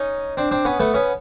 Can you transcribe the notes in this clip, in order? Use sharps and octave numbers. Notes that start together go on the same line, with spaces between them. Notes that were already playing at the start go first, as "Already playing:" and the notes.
Already playing: C#4 D#4
C4 D4
C4 D4
B3 C#4
A3 B3
B3 C#4